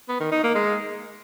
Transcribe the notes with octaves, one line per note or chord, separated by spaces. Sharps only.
B3
D#3
D#4
A#3
G#3